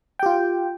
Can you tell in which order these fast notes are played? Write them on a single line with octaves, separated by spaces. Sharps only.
G5 G4 F4